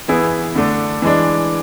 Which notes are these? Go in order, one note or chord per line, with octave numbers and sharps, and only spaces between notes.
E3 B3 E4 G#4
D3 A3 D4
E3 G#3 D4